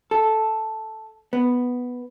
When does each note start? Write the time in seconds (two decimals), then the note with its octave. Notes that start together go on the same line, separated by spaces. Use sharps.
0.11 A4
1.33 B3